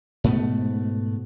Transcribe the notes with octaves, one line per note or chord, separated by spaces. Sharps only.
G#2 B2 A3 B3